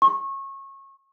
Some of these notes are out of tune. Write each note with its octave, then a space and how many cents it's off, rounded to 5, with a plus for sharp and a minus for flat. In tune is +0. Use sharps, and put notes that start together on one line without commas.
C#6 -25